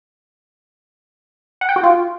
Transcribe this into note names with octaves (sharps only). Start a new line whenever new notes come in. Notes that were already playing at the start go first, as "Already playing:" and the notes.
F#5
G5
F#4
F4